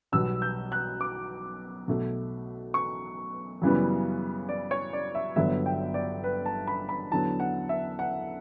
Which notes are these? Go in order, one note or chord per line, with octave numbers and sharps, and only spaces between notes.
B1 B2 G3 B3 E6
G6
F#6
D6
B1 B2 A3
C#6
F#2 C#3 E3 G3 B3
D5
C#5
D5
E5
G1 G2 D3 F#3 B3 E5
G5
D5
B4
A5
B5
B5
E2 D3 F#3 B3 A5
F#5
E5
F#5